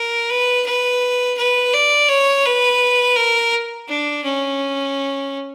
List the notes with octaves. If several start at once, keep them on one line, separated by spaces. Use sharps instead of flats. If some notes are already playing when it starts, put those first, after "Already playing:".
Already playing: A#4
B4
B4
B4
D5
C#5
B4
A#4
D4
C#4